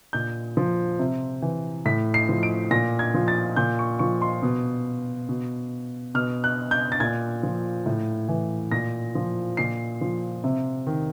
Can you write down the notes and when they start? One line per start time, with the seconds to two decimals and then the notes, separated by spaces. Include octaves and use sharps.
0.13 A#2 G6
0.57 F3
0.99 C3
1.42 E3
1.85 A2 B6
2.14 C7
2.29 F3
2.43 D7
2.71 A#2 A#6
2.99 G#6
3.14 F3
3.28 A6
3.56 A#2 G6
3.79 C#6
3.99 F3 C#6
4.22 C6
4.42 B2
5.29 B2
6.15 B2 F6
6.44 F#6
6.71 G6
6.92 A6
7.00 A#2 G#6
7.43 F3
7.86 A2
8.29 E3
8.72 A#2 A#6
9.15 F3
9.57 A#2 C7
10.01 F3
10.44 C3
10.87 D#3